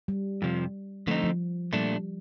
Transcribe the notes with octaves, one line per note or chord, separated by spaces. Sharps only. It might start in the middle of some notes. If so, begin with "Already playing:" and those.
G3
F2 C3 F3
D3 F3 A3 C4 D#4
F3
A#2 G3 A3 D4